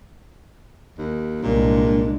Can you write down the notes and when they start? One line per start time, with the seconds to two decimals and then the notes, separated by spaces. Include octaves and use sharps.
0.98 D#2
1.43 C2 A#2 G#3 D4